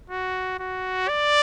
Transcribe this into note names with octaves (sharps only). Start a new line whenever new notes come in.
F#4
F#4
D5